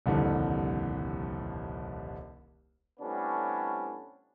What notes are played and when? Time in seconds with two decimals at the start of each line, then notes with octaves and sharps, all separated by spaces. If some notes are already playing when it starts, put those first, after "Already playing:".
0.06 D#1 C2 F2 D3
3.00 A2 C3 G3 B3 C#4 D4